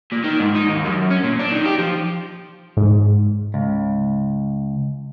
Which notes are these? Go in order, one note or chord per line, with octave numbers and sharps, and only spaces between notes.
A#2
D#3
G#2
D#4
D#2
F#2
C#4
A#2
D4
D#3
G4
F3
G#2
C#2